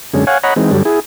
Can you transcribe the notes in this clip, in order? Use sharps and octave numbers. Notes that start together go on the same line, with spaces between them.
F#2 D3 G#3 C#4
C#5 F5 F#5 G#5
C#5 D#5 F#5 A#5 B5
E3 G#3 C4 D#4
G2 D3 F#3 G3
E4 G#4